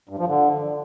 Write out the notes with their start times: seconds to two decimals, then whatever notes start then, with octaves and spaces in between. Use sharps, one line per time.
0.09 G2
0.19 F3
0.28 D3